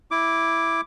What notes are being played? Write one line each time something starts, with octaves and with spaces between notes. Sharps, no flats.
E4 D6